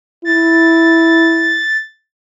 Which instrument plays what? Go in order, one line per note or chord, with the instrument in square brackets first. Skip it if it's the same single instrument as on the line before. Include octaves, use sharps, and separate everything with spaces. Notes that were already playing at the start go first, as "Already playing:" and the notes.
[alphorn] E4 [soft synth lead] A6